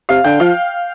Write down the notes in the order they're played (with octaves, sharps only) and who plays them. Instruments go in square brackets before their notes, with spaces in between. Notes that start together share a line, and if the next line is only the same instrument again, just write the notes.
[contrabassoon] C3 [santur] F5
[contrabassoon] D3 [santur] G5
[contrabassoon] F3 [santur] F5